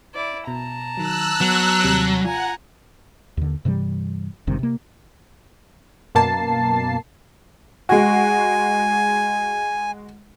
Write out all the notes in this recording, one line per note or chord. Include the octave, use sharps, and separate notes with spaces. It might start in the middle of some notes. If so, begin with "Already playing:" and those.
E4 D5
B2 A5 A#5
D#3 F#3 E6 F#6
F#3 B3
D#2 C3 G3
F4 F#5 G#5 A#5
D#2 D3
G2 C3 E3 G3
G#1 G2 C3 D#3
C3 A#3
F#2 B2 A#3 A5 C7
G#3 F#4 G#5